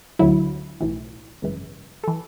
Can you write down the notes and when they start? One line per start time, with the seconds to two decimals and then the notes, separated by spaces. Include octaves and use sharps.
0.19 D2 D3 F#3 E4
0.80 B1 A2 E3
1.42 G#1 F#2 C#3 E3
2.04 E3 A4